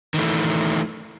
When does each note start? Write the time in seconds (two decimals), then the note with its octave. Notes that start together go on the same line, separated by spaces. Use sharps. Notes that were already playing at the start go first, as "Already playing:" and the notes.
0.14 D#3 E3 A3